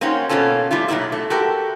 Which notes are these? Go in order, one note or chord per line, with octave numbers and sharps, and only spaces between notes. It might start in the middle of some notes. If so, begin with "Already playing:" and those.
A#3 C4 C#4 D#4 F#4
B2 A#3 C#4 F4 A4
G3 A3 E4 F4
B2 F#3 A#3 E4 E5
A3
F#4 G4 A4 A#4